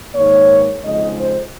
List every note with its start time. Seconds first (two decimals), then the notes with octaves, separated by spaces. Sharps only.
0.15 G#2 D#3 A#3 C#5
0.83 F2 C#3 G#3 D#4 D#5
1.17 C5